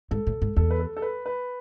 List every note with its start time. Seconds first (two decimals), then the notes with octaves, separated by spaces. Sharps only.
0.11 G#2 A4
0.27 A2
0.42 G#2
0.56 E2 A4
0.71 B4
0.79 A4
0.97 A4
1.02 B4
1.26 B4